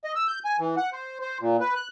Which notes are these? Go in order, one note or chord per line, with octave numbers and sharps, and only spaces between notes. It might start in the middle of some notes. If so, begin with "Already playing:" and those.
D#5
E6
G6
G#5
E3
F#5
C5
C5
A#2
B4
F#6